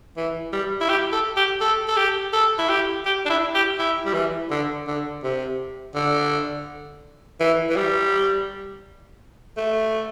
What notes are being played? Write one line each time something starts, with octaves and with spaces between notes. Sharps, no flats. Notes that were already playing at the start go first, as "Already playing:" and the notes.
E3
G3
E4
G4
A4
G4
A4
A4
G4
A4
E4
G4
G4
D4
E4
G4
E4
G3
E3
D3
D3
C3
D3
E3
E3
G3
A3